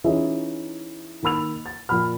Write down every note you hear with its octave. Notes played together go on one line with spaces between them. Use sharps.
E3 C#4 D#4 F4 G#4 E5
D#3 A#3 B5 E6 F7
A6
A#2 F3 B5 F6